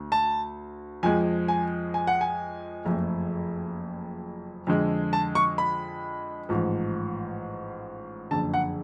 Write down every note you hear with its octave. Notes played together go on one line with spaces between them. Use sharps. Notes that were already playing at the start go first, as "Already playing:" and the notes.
Already playing: D2 D3
A5
F2 F3 G#3 G#5
G#5
G#5
F#5
G#5
F#1 F2 F3 A3
F2 D3 G#3
A5
C#6
B5
A1 G#2 F3
F#1 F2 D3 A5
F#5